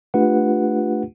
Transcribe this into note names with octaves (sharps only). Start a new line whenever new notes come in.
A3 D4 F4 G4 B4 F#5